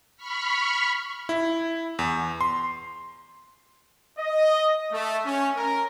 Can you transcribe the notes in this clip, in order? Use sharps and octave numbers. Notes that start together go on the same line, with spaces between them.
B5 C#6 F6 B6
E4
E2
C6
D#5
A3
C#4
A#4